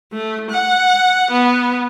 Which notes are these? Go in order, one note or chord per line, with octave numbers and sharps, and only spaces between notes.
A3
F#5
B3